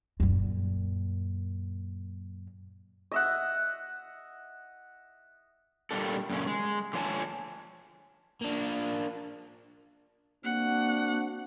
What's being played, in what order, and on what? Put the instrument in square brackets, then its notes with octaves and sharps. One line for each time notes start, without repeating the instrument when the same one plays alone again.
[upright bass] F#2 A#2
[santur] D#5 E5 F#5
[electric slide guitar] A#2 G3 A#3 D4 A4
F#2 A#2 C#3 C#4
G#3
D3 F3 C#5 G#5 A5
[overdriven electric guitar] A#3 D4
[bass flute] A#3 [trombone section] C4 D4 F#4 [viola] F#5